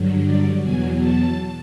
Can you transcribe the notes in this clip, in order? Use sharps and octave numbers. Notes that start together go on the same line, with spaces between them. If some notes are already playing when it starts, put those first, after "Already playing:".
Already playing: G2 D3 F#3
D5
E2 B2 F#3 G#5
A5